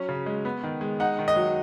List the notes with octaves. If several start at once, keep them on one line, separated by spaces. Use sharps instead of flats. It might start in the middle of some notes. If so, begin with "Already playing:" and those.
Already playing: F#3 C#4
C#3
G#3
B3
D#3
G#3
D#4 F#5
D#3
D#5
F#3